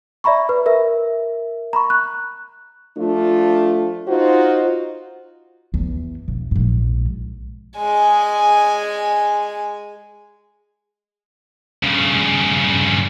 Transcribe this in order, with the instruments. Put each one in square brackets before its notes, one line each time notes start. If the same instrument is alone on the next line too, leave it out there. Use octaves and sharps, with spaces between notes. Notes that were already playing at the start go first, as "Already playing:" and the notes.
[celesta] D5 E5 A#5 B5 C#6
B4
A#4 E5
A#5 B5 C#6
F#6
[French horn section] F3 A3 D4 F4
D#4 F4 F#4 C5
[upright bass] E2
E1
A#1 G#2
[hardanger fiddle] G#3 G#5
[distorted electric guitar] G2 C#3